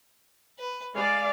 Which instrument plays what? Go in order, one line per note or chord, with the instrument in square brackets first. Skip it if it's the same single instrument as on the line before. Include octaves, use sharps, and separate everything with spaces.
[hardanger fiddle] B4
[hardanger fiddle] G#3 [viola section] D5 F5